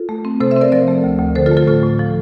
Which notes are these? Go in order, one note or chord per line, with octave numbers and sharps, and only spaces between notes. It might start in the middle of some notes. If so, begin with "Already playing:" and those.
Already playing: F4 A4
A3
C4
C3 A4 C5
C5 E5
C4 A#4 D5
F3 A#4 D5
A3
D2
D2
D3 A4 C5
F4 A4
A3
F4 A4
A2 F4 A4
A2
F3